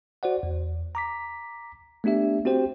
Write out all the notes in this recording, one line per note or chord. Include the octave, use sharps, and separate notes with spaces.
F#4 C5 D5 F#5
E2
A#5 D6 B6
A3 B3 D4 G4 E5
C4 F#4 G4 C5 G5